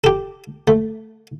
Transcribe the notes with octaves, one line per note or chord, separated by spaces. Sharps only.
G4 A4
A3